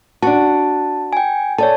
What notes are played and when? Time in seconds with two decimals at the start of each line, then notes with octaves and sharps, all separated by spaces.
0.22 D4 F#4 A5
1.13 G5 G#5
1.58 A4 C#5 D5 A5